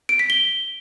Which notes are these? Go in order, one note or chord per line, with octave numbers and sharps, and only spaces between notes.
D7
B6
G7